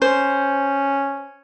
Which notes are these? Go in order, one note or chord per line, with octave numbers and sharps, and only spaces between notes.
C#4 C5